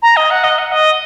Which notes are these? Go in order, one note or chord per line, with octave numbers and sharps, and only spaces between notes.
A#5
D#5
F#5
D#5
F#5
D#5